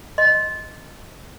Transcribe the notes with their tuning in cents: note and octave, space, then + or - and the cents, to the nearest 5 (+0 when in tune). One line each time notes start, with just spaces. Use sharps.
D#5 +5 C6 +0